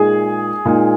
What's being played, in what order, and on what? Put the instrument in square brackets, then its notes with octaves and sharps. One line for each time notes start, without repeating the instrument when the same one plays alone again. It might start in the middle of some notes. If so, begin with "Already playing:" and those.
Already playing: [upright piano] A#2 G#3 D#4 [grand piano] G#4
[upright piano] A#2 G#3 D#4